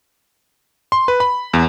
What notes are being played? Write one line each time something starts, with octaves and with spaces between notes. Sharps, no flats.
C6
B4
B5
E2